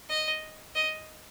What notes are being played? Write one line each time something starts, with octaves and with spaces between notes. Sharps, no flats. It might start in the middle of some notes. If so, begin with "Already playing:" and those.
D#5
D#5